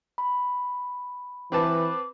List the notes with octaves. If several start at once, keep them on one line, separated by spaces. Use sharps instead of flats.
B5
E3 C4 B4 A5 D6